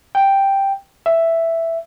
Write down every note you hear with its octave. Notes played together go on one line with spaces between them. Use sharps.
G5
E5